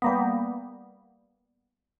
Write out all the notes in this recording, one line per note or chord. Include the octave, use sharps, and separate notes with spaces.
G3 A#3 B3